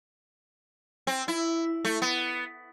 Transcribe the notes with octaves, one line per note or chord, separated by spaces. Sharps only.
C4
E4
A3
B3